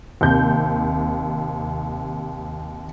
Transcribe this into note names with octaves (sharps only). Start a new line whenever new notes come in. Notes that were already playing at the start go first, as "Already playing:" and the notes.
D#2 C3 G6